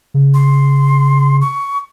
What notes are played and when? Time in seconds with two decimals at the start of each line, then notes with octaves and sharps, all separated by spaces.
0.14 C#3
0.34 C6
1.41 C#6